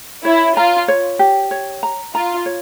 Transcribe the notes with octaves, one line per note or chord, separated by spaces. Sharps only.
E4 C#5
F4 A#5
C#5
G4
C#5
A#5
F4 A#5
C#5